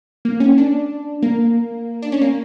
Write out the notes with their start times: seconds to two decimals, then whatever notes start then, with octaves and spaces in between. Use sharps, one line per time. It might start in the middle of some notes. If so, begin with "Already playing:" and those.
0.25 A#3
0.40 C#4
0.58 D4
1.22 A#3
2.02 D4
2.12 C#4
2.22 A#3